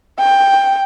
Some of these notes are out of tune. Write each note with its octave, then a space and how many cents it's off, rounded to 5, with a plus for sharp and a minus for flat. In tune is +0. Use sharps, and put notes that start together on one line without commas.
G5 +10